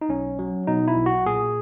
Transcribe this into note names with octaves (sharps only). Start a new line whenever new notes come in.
D#4
B1 C#4
F#3
B2 D#4
E4
B1
F#4
A#2 G#4